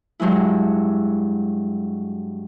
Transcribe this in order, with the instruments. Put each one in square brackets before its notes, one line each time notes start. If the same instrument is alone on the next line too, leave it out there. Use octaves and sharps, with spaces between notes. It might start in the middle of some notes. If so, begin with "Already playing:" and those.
[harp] G2 F#3 G#3 E4